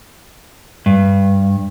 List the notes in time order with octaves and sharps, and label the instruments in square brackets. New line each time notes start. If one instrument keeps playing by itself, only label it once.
[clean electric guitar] G2